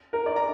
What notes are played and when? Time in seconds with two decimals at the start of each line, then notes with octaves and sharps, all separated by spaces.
0.13 A#4
0.26 D5
0.36 A#5